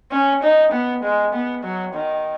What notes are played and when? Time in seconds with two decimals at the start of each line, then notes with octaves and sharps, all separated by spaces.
0.12 C#4
0.43 D#4
0.72 B3
1.03 G#3
1.33 B3
1.64 F#3
1.94 D#3